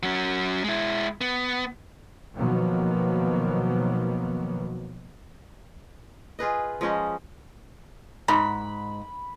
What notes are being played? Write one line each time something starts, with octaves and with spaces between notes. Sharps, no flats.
F#3 C#4
G#3 E4
B3
B2 D#3 F3 F#3 A#3 B3
F4 G#4 B4 D#5
F3 G#3 C#4 D#4
G#2 B5